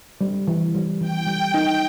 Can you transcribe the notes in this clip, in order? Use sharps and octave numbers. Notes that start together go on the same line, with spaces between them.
G3
E3
G3
E3 G5
G3
G5
D#4